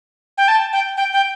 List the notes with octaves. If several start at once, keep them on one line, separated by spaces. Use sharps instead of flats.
G5
A5
G5
G5
G5